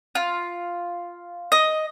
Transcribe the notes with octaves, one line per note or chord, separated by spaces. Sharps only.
F4
D#5